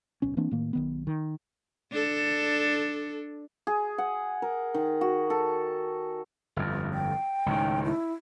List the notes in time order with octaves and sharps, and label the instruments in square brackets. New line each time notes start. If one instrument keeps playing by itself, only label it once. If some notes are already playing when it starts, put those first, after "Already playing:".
[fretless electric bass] D1 B1 C#4
E3 A#3 C4 D4
A2 D#3 A#3
B1 D#3 B3
D#3
[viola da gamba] D4 A4
[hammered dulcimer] G#4
F#5
A#4
D#3
F#4
A4
[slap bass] G1 F2
[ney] G5
[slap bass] C#2 A2 D#3
[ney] E4